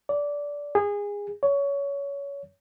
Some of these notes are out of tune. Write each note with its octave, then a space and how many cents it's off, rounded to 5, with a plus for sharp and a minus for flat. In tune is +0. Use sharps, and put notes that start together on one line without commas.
D5 -15
G#4 -25
C#5 +20